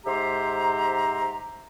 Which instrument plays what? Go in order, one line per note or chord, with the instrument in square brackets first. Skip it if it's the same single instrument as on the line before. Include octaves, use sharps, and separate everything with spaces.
[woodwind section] G#2 G4 C5 E5 A#5